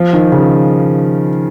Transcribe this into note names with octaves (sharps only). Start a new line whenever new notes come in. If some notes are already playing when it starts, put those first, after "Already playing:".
Already playing: F3
D#3
C#3